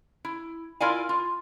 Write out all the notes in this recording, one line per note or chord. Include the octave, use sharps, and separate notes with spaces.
E4
E4 F4 A#4 D5 F5 G#5
F4